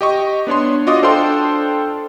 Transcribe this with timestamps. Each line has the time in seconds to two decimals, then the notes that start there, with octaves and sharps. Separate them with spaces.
0.01 G4 D#5 C#6
0.47 B3 D4 C#5 C6
0.87 F4 F#4 D#5 D6 D#6
1.03 D4 A4 C5 F5 G5 C6